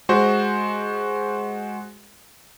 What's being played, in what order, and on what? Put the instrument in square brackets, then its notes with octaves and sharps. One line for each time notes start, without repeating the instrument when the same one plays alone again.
[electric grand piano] G#3 F#4 C5